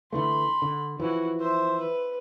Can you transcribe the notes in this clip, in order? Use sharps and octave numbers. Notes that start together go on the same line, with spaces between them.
D3 E3 A3 B5 C6
D3
E3 F3 E4 F#4
C5 E5
B4